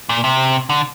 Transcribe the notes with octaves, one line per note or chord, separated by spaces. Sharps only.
A#2
C3
D3